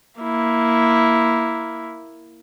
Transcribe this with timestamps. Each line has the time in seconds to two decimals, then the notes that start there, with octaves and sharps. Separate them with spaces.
0.21 A#3 E4